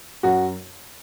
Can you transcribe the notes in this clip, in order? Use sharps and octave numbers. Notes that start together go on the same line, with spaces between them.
F#2 F#4